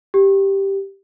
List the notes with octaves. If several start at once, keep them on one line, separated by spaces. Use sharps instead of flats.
G4